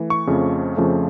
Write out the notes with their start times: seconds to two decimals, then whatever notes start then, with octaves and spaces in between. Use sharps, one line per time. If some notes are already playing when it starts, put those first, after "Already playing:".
Already playing: E3 A3
0.10 C#6
0.27 F2 C#3 F3 A3
0.77 F2 C#3 F3 A3